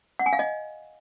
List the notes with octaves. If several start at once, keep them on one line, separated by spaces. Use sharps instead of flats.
F#5
G#5
F5
D#5